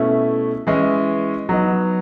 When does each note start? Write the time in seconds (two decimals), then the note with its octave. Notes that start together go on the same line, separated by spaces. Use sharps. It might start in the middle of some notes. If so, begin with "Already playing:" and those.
Already playing: B2 A3 C#4 E4
0.67 E3 G#3 C#4 E4
1.49 F#3 B3 D#4